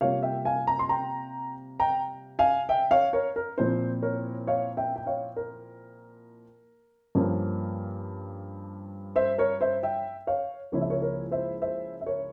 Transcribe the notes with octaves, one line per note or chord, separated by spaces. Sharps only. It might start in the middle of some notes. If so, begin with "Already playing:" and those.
C3 G3 A#3 F4 C#5 F5
E5 G5
F5 G#5
A#5
C6
G5 A#5
G5 A#5
F5 G#5
E5 G5
C#5 F5
A#4 C#5
A#4
A#2 F3 C4 E4 C5
A#4 C#5
C#5 F5
E5 G5
G5
C#5 F5
A#4
G2 F3 A#3 C#4
C5 E5
A#4 C#5
C5 E5
E5 G5
C#5 F5
C#2 C#3 F3 A#3 E4 C#5
E5
A#4 C#5
A#4 C#5
C5 E5
C5 E5
E5
A#4 C#5